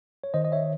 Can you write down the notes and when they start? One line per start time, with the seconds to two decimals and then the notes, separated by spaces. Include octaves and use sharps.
0.24 C#5
0.34 D#3 C5 D#5
0.45 D#5
0.52 C#5 E5